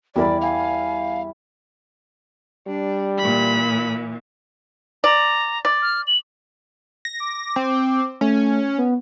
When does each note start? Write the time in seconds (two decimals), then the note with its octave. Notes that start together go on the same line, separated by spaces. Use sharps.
0.16 E2 G3 E4 A#4 D5 B5
0.41 F5 G#5
2.67 G3 D4
3.18 A#2 E3 B5
5.04 D5 A#5
5.65 D5
5.82 F6
6.07 F#7
7.05 A#6
7.20 D6
7.56 C4
8.21 A3 C#4
8.78 B3